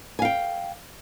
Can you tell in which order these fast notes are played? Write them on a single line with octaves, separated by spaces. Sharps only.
G#5 F5 G5